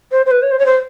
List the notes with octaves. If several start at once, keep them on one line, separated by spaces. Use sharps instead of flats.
C5
C5
B4
C#5
C5
C#5
C5